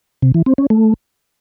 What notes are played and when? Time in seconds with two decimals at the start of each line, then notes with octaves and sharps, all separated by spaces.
0.22 C3
0.34 E3
0.46 C4
0.58 C#4
0.70 A3